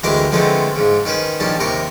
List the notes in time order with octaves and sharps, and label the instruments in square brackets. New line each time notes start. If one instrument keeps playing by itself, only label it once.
[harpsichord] D2 E3 G#3 G4 A#4 F5
D3 F3 G#3 A3 B3 C4
G#2 C#3
D#3 C#4 B4 C5
A#1 D#3 G3 C#4 A5
D#2 C3 A#4 C#6